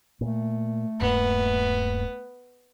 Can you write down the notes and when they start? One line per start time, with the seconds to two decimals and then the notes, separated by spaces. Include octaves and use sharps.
0.21 A#2 A3
1.01 D#1 G2 A#3 B3